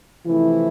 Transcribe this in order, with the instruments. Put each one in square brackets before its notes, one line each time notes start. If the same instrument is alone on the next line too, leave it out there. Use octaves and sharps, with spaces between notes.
[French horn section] C3 E3 F3 A3 E4